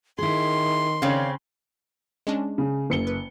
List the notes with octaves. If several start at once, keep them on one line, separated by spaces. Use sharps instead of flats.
D#3 E4 G#4 C6
C#3 C4 C#5 D5 F5
G#3 C#4 D4
C#3
F#1 C#7 G7
B4